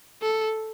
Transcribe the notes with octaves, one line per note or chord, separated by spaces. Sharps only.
A4